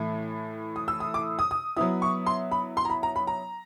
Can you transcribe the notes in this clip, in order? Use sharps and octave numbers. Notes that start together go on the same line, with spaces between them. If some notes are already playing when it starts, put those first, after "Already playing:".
Already playing: A2 E3 A3
D#6
E6
D#6
D6
D#6
D#6
F#3 B3 E4 D#6
C#6
C6
B5
C6
A#5
B5
A#5
B5
A#5